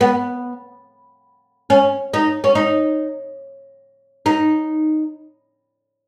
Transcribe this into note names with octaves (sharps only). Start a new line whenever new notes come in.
B3
C#4
D#4
C#4
D#4
D#4